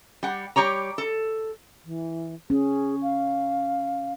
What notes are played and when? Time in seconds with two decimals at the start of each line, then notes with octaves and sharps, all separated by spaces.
0.23 G3 F#5
0.56 G3 G4 C#5 A#5
0.98 A4
1.85 E3
2.50 C#4 G#4
3.03 F5